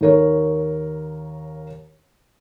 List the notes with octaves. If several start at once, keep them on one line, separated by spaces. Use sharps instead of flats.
D#2 A#4 C#5